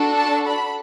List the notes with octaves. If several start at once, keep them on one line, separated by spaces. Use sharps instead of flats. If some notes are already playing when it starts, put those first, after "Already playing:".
Already playing: D4 F#4 A4
A5
B5